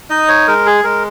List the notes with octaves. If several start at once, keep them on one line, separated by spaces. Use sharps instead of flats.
D#4 D#5
C#5
G#3 A#4
G#4
G#3 A#4